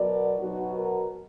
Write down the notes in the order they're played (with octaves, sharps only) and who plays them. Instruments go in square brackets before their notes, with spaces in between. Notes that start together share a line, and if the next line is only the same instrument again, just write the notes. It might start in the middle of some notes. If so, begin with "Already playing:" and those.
Already playing: [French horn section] B2 F#3 A#4 D5
B2 F#3 D#4 F#4
F#4 A#4